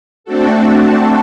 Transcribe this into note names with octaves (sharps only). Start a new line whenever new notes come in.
A3 C4 D4 F#4 A4